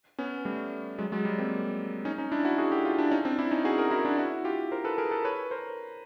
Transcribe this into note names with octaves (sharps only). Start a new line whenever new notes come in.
B3 C#4
G3 A3
F#3 G#3
F#3 G#3
G3
A#3 C4
C#4 D#4
C#4 D#4
D4 E4
E4 F#4
F#4 G#4
G4 A4
F4 G4
D4 E4
C#4 D#4
C4 D4
D4 E4
C#4 D#4
F#4 G#4
G#4 A#4
E4 F#4
D4 E4
E4 F#4
F4 G4
A#4 C5
A4 B4
G#4 A#4
A4 B4
B4 C#5
A#4 C5